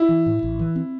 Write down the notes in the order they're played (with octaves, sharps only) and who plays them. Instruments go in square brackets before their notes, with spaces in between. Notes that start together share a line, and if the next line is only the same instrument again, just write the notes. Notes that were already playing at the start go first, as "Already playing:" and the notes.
Already playing: [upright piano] E4
[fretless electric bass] E3
A2
A1
E3
C4